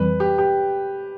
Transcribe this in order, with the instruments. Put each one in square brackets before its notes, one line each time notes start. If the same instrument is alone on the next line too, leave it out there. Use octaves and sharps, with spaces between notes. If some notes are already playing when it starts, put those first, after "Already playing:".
Already playing: [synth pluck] F2 E3 G3 [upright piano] B4
[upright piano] G4
G4